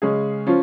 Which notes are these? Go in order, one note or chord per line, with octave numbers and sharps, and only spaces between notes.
C#3 G#3 C#4 G#4
F3 C#4 F4